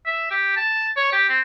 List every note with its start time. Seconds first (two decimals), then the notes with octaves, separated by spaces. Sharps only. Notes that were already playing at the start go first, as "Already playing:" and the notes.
0.07 E5
0.31 G4
0.56 A5
0.97 C#5
1.13 G4
1.29 C4